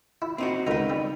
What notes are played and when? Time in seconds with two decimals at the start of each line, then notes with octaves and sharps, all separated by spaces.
0.22 E4
0.38 C4 D#4 F#4
0.67 C#2 D#4 A#4 B4
0.90 G3